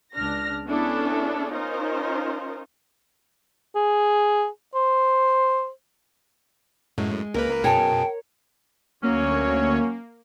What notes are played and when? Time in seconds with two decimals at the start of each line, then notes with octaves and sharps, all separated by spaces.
0.14 C#2 D4 F6 A#6
0.66 B3 C#4 D4 E4 G#4 A4
1.51 C#4 D#4 F4 A#4 C5
3.76 G#4
4.75 C5
6.98 F#2 A2 G#3
7.34 C#2 A#3 A#4 B4
7.64 F#2 B2 G#4 C#5 G5 A5
9.03 D2 F#3 A#3 C#4 C#5